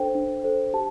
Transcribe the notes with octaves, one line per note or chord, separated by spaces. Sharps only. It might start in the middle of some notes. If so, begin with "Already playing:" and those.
Already playing: D4 A4 C5 G5
D4
A4 C5
G4 A5